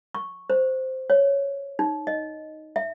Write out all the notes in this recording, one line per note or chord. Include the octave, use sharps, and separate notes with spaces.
C#6
C5
C#5
D#4
D#5
E5